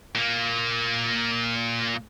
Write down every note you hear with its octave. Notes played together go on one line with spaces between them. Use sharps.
A#2 A#3